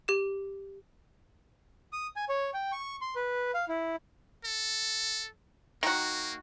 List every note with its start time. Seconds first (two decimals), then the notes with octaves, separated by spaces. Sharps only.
0.08 G4 E7
1.93 D#6
2.16 G#5
2.29 C#5
2.54 G5
2.72 C#6
3.01 C6
3.16 B4
3.54 F5
3.69 E4
4.45 A4
5.83 D#3 A#3 F#4